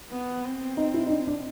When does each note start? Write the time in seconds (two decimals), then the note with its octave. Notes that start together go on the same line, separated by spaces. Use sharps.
0.11 B3
0.44 C4
0.77 D#4
0.94 E4
1.07 D#4
1.10 D4
1.27 D4